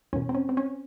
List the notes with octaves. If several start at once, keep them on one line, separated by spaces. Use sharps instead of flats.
E2 B2 C#4
C4
C#4
C4
C#4